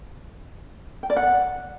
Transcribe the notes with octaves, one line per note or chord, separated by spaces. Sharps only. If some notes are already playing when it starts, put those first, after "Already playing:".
G5
D5
F#5